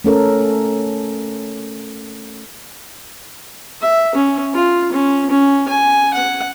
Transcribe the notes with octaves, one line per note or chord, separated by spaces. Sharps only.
A3 C#4 A4 A#4
E5
C#4
F4
C#4
C#4
G#5
F#5